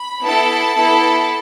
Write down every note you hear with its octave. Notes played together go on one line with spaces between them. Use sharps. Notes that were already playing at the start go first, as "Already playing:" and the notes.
Already playing: B5
B3 E4 A4 A5
B3 E4 A4